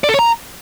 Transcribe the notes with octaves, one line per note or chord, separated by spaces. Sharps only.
D5
A4
C#5
A#5